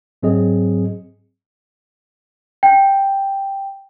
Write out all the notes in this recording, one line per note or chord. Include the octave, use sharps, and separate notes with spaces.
G#2 F#3 C4 G#4 D#5
G5